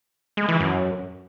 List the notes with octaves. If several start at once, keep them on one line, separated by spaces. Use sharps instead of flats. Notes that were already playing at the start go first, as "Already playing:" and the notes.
G#3
E3
F#2